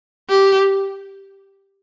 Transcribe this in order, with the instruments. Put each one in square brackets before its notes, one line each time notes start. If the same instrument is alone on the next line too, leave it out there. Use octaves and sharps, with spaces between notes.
[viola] G4